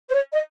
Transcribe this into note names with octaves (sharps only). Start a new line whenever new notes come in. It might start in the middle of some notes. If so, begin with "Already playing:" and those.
C5
C#5
D#5